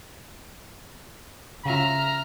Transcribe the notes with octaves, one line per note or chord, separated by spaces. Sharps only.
C#3 F4 E5 A#5 F6